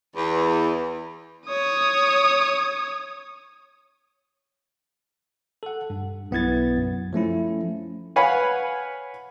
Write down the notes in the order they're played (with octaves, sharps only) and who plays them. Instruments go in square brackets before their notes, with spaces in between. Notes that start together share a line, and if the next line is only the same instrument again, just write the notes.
[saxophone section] E2
[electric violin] C#5 D#6
[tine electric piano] A4 F#5
G2
B1 B3 E4 G#6 A6
F#2
F3 A3 C#4 E4
[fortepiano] B4 C#5 F5 F#5 G#5 B5